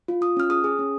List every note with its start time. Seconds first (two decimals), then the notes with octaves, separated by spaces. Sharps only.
0.08 F4
0.21 F4 D#6
0.37 C#4 F6
0.50 G#4 D#6
0.64 G#4
0.79 C#4